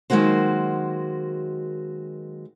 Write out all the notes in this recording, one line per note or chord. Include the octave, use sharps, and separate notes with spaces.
D#3 F#3 G#3 A#3 F#4 C5